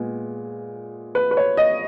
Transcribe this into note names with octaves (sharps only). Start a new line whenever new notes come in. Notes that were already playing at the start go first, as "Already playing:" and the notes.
Already playing: A#2 G#3 B3
B4
B4
C#5
D#5